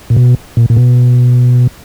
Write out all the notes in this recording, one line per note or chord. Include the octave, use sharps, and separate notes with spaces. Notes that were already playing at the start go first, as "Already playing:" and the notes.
A#2
B2
A#2
A#2
B2